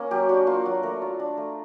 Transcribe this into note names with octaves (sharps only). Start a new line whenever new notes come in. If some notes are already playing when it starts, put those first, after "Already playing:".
Already playing: A#3 C#4
F#3 G4
D4 F#4
A#3 F4
F#3 F#4
A3 A#4
F4
D4
A3